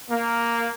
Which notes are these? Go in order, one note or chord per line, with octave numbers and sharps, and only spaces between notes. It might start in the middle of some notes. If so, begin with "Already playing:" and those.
A#3